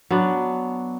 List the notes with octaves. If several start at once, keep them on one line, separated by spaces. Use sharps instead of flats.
F#3 B3 D4